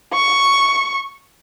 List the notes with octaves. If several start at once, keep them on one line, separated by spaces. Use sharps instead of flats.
C#6